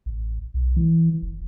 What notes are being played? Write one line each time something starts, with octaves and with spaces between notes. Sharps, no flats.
A1
B1
E3
F#1